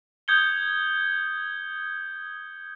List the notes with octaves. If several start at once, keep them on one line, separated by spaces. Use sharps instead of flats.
D#6 G6 G#6 C#7 G7